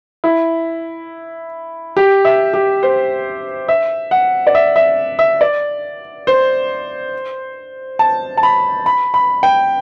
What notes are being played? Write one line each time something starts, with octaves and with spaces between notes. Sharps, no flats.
E4
G4
E5
G4
C5
E5
F#5
D5
E5
E5
E5
D5
C5
A5
A5
B5
B5
B5
G5